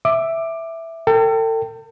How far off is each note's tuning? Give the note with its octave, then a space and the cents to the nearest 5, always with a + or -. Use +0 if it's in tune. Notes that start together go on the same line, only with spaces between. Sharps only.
E5 +0 D6 +15
A4 +40 G5 +0